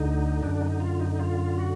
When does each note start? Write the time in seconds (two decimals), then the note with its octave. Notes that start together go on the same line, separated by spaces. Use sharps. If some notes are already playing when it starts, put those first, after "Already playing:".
Already playing: D2 D3 D#4
0.42 F#2 D3 D4
0.61 D#4
0.80 F4
0.99 D#4
1.11 D#4
1.20 F4
1.58 F#4